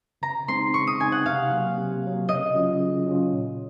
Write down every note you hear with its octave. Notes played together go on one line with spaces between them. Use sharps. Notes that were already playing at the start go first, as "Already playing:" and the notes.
C#3 A#5
G#3 C4 D#4 C6
C#3 C#6
D#6
G#3 C4 D#4 G#5
F#5
C3 F5
F#3 A#3
C3
F#3 A#3
C#3 D#5
F#3 C#4 F4
C#3
F#3 C#4 F4
A#2